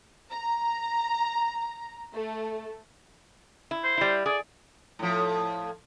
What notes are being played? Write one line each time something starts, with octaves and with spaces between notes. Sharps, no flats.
A#5
A3
E4
C5
G3 E4
G#4 D5
A2 F3